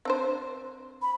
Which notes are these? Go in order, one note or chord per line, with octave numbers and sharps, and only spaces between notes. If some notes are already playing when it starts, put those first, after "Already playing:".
C4 D4 C5
B5